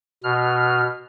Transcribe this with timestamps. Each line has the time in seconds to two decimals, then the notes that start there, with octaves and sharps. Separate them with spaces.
0.24 B2 F6